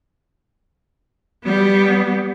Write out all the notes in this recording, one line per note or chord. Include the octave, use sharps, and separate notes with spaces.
G3 B3